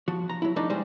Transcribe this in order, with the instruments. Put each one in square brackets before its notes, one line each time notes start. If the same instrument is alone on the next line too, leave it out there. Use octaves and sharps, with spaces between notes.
[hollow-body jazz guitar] F3 F#4
A#5
F#3 E4
F3 A3 D4 D#4
G3 G#3 C5